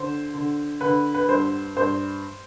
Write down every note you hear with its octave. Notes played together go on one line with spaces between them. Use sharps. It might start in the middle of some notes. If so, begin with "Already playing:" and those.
Already playing: D3 C5
D3
D3 B4
B4
G2 C5
G2 C5